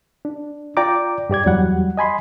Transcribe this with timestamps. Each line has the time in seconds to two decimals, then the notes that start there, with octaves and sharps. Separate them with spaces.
0.25 D4
0.77 F4 D5 G5 A#5 D6
1.30 G2 G4 D5 G#6
1.46 E2 F#3 G3 F#5
1.97 D#5 G#5 B5 C6